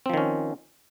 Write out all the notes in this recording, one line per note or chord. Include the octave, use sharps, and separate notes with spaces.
D#3 F3 C4 C#4